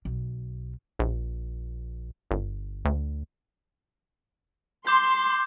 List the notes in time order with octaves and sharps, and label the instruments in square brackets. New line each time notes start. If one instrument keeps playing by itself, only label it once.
[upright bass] B1
[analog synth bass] A#1
G1
D2
[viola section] C6 [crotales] D6 G6